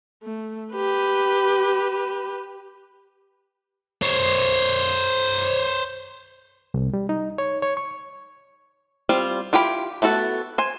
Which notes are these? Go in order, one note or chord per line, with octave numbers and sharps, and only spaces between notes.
A3
G4 B4
C5 C#5
C2
G3
D#4
C#5
C#5
C#6
G3 C4 F4
E4 F4 G4 G5 B5
A3 B3 F#4 A4
C5 G#5